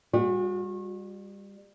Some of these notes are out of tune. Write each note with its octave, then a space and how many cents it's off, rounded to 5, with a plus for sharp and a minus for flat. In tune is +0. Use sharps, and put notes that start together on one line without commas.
G3 +30 F#4 -35